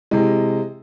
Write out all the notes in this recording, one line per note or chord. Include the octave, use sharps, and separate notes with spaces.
C3 E3 G#3